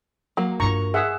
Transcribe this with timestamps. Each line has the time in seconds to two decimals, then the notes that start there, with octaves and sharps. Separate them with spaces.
0.37 F#3 A#3
0.60 G2 F4 A#5 C#6
0.94 G#4 E5 F#5